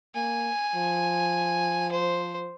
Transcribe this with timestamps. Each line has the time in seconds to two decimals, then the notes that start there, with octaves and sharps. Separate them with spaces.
0.15 A#3 G#5
0.75 F3
1.92 C5